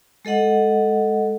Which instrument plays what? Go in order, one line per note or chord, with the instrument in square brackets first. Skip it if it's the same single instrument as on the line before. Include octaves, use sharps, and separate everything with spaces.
[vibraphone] G#3 A4 D#5 F#5